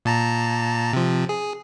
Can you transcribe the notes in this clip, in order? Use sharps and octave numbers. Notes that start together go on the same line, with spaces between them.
A#2 A5 A#5
C3 F3
G#4